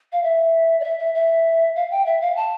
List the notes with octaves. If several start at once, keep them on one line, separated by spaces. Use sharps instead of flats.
F5
E5
D5
E5
E5
E5
F5
G5
E5
F5
A5